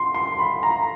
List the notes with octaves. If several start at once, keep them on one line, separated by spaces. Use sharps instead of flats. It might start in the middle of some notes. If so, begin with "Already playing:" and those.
Already playing: C6
C6
B5
A#5